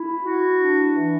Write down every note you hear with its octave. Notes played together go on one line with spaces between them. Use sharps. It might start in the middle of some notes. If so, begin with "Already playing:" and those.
Already playing: E4
F#4
D4
E3